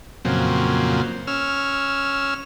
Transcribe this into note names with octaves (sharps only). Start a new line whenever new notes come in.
F2 A#2 C#3 F#3 C4
C#4 E6 F6